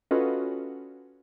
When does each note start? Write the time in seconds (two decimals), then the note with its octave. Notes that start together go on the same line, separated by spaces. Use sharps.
0.11 C#4 F4 F#4 A4 B4 D#5